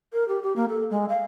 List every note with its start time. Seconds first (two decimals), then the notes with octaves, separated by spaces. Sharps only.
0.13 A#4
0.28 G4
0.43 G4
0.56 A#3
0.69 A4
0.90 G#3
1.09 F5